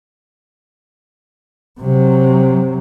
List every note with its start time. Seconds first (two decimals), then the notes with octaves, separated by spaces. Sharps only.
1.81 C3 F#3